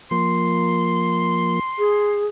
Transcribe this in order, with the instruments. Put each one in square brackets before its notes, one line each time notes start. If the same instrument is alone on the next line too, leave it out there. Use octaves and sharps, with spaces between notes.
[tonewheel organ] F3 A#3 [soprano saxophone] C6
[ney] G#4